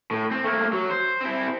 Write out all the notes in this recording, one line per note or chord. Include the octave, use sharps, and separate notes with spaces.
A2
C4
A3 A#3
F#3
C5
C4 E4